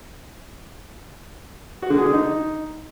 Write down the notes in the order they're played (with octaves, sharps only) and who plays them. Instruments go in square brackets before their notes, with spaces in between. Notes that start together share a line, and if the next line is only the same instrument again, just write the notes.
[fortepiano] F#4
D3
G#4
D3
D#4